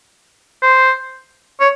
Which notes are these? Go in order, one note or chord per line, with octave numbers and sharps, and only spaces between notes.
C5
C#5